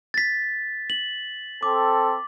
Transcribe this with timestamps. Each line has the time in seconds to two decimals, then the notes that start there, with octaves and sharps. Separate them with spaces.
0.14 A6 B6
0.90 F#7
1.63 C4 A4 D6